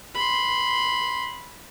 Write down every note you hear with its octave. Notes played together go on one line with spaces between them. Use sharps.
B5 C6